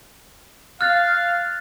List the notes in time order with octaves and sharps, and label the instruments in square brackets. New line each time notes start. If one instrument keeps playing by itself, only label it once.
[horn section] F5 [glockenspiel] F6 F#6 A6